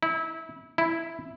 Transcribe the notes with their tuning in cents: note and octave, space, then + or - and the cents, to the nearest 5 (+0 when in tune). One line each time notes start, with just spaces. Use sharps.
E4 -25
E4 +0